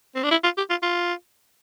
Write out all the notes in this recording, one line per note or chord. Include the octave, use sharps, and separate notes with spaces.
C4
D4
E4
F4
G4
F4
F4